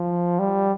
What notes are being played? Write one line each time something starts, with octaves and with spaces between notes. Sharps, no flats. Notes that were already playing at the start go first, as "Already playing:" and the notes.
Already playing: F3
G3